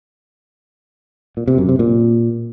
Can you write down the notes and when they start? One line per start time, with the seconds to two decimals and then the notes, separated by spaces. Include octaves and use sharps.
1.37 A#2
1.48 C3
1.58 F#2
1.69 C3
1.79 A#2